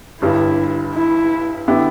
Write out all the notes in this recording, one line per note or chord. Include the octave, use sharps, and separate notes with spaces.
G1 G2 G3 E4
E4
D3 B3 E4 G4